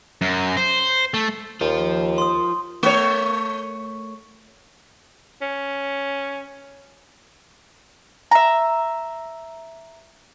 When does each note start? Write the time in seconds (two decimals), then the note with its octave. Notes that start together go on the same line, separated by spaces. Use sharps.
0.21 F#2
0.57 C5
1.14 A3
1.61 D#2 F4 C5
2.18 C6 D#6
2.83 A3 C#5
5.42 C#4
8.31 E5 A#5